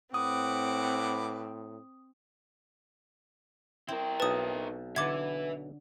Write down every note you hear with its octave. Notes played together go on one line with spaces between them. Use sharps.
A2 C4 B4 F#5 D6 D#6
C4 E4 A#4
B1 B4 A5 D#6
D3 A4 B4 E5 F#5 D6 G#6